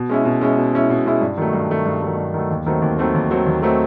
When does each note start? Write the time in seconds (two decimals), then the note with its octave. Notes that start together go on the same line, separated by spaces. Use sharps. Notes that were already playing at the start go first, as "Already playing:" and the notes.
Already playing: B2
0.09 G#3 C#4 E4
0.25 B2
0.41 G#3 C#4 E4
0.57 B2
0.73 G#3 C#4 E4
0.90 B2
1.06 G#3 C#4 E4
1.21 G2
1.38 D#3 F#3 A3
1.53 G2
1.70 D#3 F#3 A3
1.86 G2
2.02 D#3 F#3 A3
2.17 G2
2.34 D#3 F#3 A3
2.51 D#2
2.66 D#3 F#3 A3 C4
2.82 D#2
2.98 D#3 F#3 A3 C4
3.14 D#2
3.30 D#3 F#3 A3 C4
3.46 D#2
3.62 D#3 F#3 A3 C4